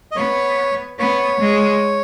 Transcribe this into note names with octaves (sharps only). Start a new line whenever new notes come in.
D#5
B3 C#5
B3 C#5
G#3